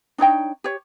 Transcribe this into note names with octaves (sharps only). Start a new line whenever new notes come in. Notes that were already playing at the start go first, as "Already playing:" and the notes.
D4 D#4 C#5 G5
G4 C#5